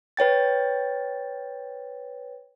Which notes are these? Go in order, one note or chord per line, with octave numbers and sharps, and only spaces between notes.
B4 C#5 G5 A6